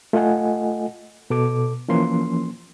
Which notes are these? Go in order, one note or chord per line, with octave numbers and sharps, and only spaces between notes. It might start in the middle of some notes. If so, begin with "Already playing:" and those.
A3 F4 A4 D#5 F#5 G#5
B2 A4 D6
E3 F3 A#3 C#4 C6